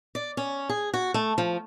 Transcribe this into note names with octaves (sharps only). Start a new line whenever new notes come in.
D5
C#4
G#4
F#4
A3
F3